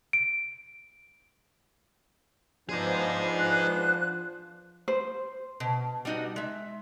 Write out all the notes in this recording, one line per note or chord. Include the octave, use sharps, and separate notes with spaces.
D7
F3 B3 D4 D#4 G#4 C5
F#6
C5
B2
G3 B3 D#4 F#4
G#3 E5